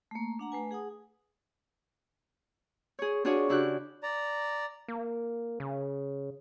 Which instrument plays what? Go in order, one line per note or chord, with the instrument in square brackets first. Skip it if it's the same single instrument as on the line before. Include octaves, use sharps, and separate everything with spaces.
[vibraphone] A3 A#3
D4 F#5 A#5
A3 B4 G#5
G#4 F#5 G#5 D#6
[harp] G#4 C#5
D4 F4 F#4 G#4 C#5
C#3 D4 E4 F#4 G4 F#6
[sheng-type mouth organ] D5 A#5
[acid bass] A#3
C#3